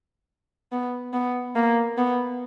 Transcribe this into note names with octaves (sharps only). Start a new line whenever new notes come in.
B3
B3
A#3
B3